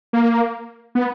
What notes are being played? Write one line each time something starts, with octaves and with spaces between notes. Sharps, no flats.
A#3
B3